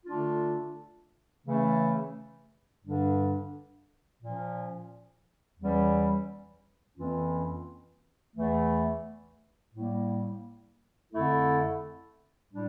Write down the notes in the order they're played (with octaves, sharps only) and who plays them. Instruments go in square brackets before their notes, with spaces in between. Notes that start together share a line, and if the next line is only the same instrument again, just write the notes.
[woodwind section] D3 A3 D4 F4
C#3 E3 A3 C#4
G2 D3 G3 D4
A#2 F3 C#4
E2 E3 G3 C#4
F2 E3 A#3 C#4 F4
E2 E3 A3
A2 G3 A#3
F2 D3 A3 E4 A4
A2 G3 D4